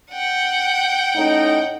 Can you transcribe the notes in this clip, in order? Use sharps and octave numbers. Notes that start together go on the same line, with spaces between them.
F#5 G5
A2 C#4 D#4